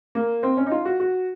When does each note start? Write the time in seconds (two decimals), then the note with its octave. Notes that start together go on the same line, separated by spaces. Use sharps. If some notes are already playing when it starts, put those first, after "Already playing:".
0.15 A#3
0.43 C4
0.57 C#4
0.66 D#4
0.71 F4
0.85 F#4
1.00 F#4